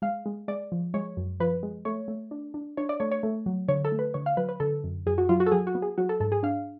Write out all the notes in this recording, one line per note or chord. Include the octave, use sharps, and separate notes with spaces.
G#3 F5
G#3
G#3 D5
F3
G#3 C#5
F#2
F3 B4
G#3
A3 C#5
A3
D4
D4
D4 C#5
D5
A3 C#5
C#5
A3
F#3
D3 C#5
A4
A3
B4
D3 C#5
F5
F#3 B4
B4
D3 A4
F#2
F#2 G#4
F#4
F#3 F4
F#4
A4
F#3 G#4
F#4
B3
G#4
F#3 F#4
A4
G#2 A4
G#4
D4 F5